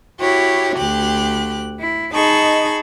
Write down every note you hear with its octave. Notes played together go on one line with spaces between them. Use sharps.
E4 F#4 G4 C#5
D2 G4 F#6
E4
D#4 G#4 D#5 A5 B5 C#6